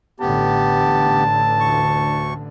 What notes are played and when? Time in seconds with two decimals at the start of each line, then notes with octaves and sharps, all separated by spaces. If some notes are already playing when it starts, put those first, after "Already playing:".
0.20 A1 D3 B3 G4 A5
1.60 D2 C#6